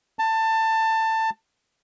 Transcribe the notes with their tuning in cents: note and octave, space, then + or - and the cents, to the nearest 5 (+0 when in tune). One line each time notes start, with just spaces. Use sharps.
A5 +20